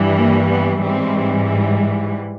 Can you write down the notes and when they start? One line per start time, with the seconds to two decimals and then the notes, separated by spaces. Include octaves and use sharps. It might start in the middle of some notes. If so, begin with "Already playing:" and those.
Already playing: G2 E3 G3
0.17 A#3
0.50 B3
0.83 G#2 E3 G3 C4